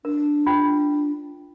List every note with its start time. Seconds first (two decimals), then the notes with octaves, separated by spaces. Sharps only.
0.05 D4 A#4
0.46 F4 G5